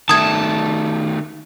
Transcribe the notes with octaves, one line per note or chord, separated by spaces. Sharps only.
D#3 A3 A5 D#6 G#6